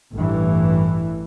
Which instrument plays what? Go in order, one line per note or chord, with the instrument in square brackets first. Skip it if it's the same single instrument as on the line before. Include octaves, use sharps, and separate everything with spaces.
[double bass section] A1 G2 E3